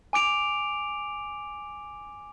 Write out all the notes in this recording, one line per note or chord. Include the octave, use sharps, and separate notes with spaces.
G#5 D6 D7 F7